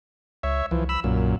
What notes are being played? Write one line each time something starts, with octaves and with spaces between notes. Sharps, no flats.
C#2 C#5 E5
C2 E3 F3
B5 E6
B1 F#2 A#2